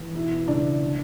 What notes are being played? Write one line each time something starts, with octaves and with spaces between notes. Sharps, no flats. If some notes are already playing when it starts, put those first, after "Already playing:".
Already playing: E3
B2 E4 E5
C#2 D4 D5
D3